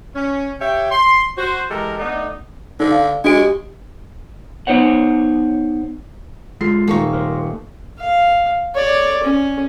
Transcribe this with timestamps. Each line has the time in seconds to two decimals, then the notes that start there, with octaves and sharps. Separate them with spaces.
0.15 C#4
0.61 G4 C#5 E5 G5
0.91 C6
1.38 F#4 C5
1.70 E3 G#3 G4 A4 A#4
1.99 A3 B3 D4 D#4
2.80 D3 D#4
2.91 F5
3.24 G#3 D4 F#4 D7
3.38 G4
4.67 B3 D#4 C5 C#5 F#5
6.61 G#3 F4 A4 C7
6.88 D#1 A3 A#3 D#4 C#6
7.13 A#4 C5
7.99 F5
8.75 C#5 D5
9.23 C#4